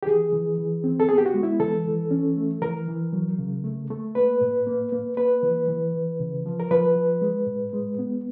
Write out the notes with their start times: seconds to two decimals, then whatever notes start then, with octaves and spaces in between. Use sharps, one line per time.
0.03 G4
0.06 E3 G#4
0.33 E3
0.58 E3
0.84 C4
1.00 A4
1.09 B3 G#4
1.18 G4
1.26 F#4
1.34 G#3
1.43 E4
1.60 E3 A4
1.86 E3
2.11 C#4
2.37 A3
2.62 E3 A#4
2.88 E3
3.13 F#3
3.39 C#3
3.64 A3
3.90 A3
4.15 A#3 B4
4.41 A2
4.67 A#3
4.92 A#3
5.17 A#3 B4
5.43 E3
5.68 E3
5.94 E3
6.20 C#3
6.46 F3
6.60 A#4
6.71 F3 B4
6.96 F3
7.22 G#3
7.47 A2
7.73 G#3
7.99 B3